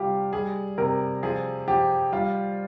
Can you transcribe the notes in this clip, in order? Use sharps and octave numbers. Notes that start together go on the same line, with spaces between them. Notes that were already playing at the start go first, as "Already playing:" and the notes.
Already playing: C3 G3 F4 G4
G3 G#4
C3 A#4
F3 G#4
F3 G4
G3 F4